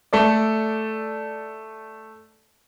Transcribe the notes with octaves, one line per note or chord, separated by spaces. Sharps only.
A3 A4 D5